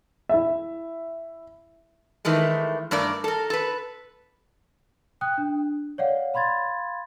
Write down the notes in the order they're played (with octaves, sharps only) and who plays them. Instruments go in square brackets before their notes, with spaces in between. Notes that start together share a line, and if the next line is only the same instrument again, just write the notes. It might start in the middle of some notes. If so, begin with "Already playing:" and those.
[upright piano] E4 E5
[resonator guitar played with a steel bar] D#3 E3 G#3 A3
G2 A3 A#4 D5
A4 A#4
A4 B4
[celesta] G5 D#6 F#6
D4
C#5 D5 F5 F#5
F5 B5 C6 G#6 A6